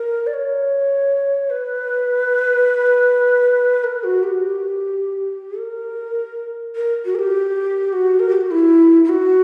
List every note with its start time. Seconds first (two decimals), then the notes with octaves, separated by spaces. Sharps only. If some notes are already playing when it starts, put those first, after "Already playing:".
Already playing: A#4
0.27 D5
0.34 C#5
1.50 B4
3.84 A#4
4.04 F#4
4.23 G4
5.59 A#4
6.76 A#4
7.05 F#4
7.15 A#4
7.19 G4
7.93 F#4
8.19 A#4
8.29 G4
8.41 F#4
8.51 E4
9.04 E4
9.09 F#4